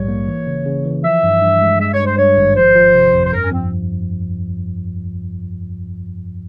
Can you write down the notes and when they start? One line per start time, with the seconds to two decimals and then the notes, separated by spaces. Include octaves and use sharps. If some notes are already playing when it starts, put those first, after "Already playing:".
Already playing: A#1 G#2 G3 C#5
0.08 A#3
0.28 E3
0.47 C#3
0.66 C#3
0.85 E3
1.04 F3 E5
1.23 G2
1.41 G2
1.61 G#3
1.79 G#3 E5
1.93 C#5
2.00 G2
2.06 C5
2.18 G2 C#5
2.37 G#1
2.56 F3 C5
2.76 F3
2.94 C3
3.13 F2
3.26 C5
3.33 G2 A#4
3.43 C#4
3.51 F3 C4